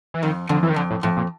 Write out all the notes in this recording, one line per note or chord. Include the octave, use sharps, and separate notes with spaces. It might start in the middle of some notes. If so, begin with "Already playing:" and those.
E3
F2 D#3
F2 D3
E3
D#3
F2 D3
A2
F2 A2
A#2